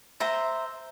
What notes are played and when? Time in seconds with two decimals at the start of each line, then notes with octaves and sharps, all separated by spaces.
0.20 C5 E5 A#5